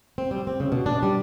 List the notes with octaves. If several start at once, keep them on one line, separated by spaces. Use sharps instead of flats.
C4
G3
C4
C#3
B2
D4
G3